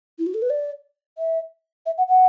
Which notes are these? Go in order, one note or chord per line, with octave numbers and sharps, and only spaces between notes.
E4
F#4
A4
B4
D5
E5
E5
F#5
F#5